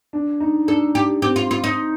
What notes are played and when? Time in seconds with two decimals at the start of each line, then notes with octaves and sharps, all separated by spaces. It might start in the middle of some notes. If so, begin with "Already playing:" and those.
0.13 D4
0.40 D#4
0.68 D4 A4
0.95 G4
1.22 C4 G4
1.36 F4
1.51 F4
1.64 D#4